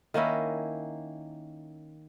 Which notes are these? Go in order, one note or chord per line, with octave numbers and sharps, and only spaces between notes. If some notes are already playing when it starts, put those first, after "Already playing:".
D#3 A#3 C#4 E4